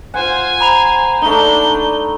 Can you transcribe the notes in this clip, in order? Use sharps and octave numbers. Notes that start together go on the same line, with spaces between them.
F4 C5 F#5 G#5
C5 A#5 B5 F7
A3 D4 D#4 G7